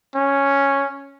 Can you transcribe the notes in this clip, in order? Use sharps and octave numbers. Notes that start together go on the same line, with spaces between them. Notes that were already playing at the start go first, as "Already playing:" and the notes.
C#4